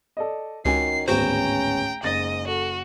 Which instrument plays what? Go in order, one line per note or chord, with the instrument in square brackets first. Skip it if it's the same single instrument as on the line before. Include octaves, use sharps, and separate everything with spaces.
[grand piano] A4 D5 D#5
[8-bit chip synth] C#2 [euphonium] D#3 [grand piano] C#4 F#4 G#5 [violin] C7
[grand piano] D1 G#1 B3 [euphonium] C#4 [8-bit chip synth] F#4 C5 [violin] G5 A#5
[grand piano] F#1 A6 A#6 [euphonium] G#2 [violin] D#5
[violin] F#4 [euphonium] A4